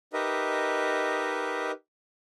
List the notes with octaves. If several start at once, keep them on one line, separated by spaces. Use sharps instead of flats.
D#4 G4 A#4 B4 D#5 E5